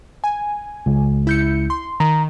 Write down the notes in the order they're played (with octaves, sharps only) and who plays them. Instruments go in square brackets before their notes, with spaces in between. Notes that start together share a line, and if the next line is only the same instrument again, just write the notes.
[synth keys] G#5
[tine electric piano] C#2
[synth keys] E4 G6 C#7
C6
[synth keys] D#3 [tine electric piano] A#5